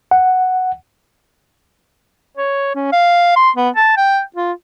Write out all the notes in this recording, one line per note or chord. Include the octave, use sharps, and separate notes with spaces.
F#5
C#5
C#4
F5
C6
B3
A5
G5
F4